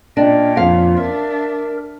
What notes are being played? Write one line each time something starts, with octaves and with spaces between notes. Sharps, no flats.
A#2 C#4 D4 D#5 G5
F2 F3 F4 F5
D4 A#4 E5